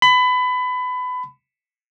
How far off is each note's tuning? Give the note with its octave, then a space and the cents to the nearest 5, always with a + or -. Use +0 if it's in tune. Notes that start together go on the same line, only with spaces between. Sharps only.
B5 +25